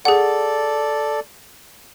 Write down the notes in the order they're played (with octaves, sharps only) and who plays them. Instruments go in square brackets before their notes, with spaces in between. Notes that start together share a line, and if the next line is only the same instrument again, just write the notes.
[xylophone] G#4 F#5 [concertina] A4 D5